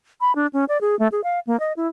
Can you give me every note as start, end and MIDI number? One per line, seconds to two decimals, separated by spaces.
0.21 0.34 83
0.35 0.47 62
0.53 0.65 61
0.69 0.80 74
0.81 0.98 68
0.99 1.08 57
1.12 1.21 68
1.24 1.39 77
1.47 1.59 58
1.60 1.73 75
1.77 1.87 64